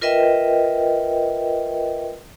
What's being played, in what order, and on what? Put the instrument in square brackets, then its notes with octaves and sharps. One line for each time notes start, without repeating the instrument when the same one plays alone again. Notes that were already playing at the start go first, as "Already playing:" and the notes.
[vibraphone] F4 A#4 B4 D#5 E5 G5